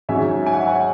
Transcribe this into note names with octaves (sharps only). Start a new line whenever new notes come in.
G#2 F#3 C#4 E5 G#5
G#5
F#5
E5
C#5 F#5